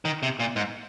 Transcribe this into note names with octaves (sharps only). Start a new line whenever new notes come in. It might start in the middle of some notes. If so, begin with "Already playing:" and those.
D#3
C3
A#2
G#2